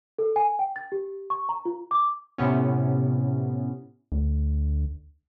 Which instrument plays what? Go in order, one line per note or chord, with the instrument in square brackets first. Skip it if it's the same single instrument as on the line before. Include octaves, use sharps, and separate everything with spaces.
[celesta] A4
G#5
G5
A6
G4
C#6
A#5
F4
D6
[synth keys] A2 C3 B3 C#4
[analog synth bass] D2